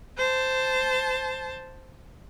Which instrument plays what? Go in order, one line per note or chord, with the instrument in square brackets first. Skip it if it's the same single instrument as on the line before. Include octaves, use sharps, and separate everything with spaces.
[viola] C5 A5